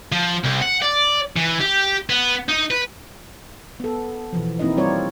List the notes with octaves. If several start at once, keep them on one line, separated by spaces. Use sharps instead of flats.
F3
C2
F#5
D5
E3
G4
B3
D#4
B4
B3 A4
B2 E3 F3
A#3 C4 D#4 E4 D#5
G3 C4 F4 A#4 C#5 D5